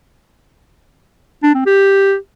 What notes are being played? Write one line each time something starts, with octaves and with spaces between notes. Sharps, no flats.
D4
C4
G4